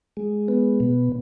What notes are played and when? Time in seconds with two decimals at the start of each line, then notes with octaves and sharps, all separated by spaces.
0.17 G#3
0.48 B3
0.80 B2